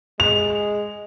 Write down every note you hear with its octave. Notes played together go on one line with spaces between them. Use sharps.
G#3 F7